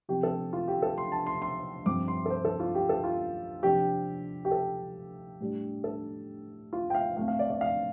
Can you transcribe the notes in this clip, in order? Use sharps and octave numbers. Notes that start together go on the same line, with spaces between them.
C3 F3 C4 G4
A4
F4
G4
A4
C6
A5
C6
C6
G2 F3 C4 D6
C6
A4
C5
A4
F4
G4
A4
F4
C3 F3 D4 G4
G4
A4
A2 G3 D4
A4
F4
G5
F5
A2 A3 C4 F5
F5
D5
D5
F5